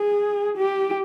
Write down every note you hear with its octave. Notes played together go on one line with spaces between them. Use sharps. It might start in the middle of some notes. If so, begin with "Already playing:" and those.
Already playing: G#4
G4